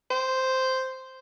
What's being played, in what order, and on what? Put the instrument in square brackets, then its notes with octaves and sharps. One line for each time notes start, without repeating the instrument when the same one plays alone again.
[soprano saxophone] C5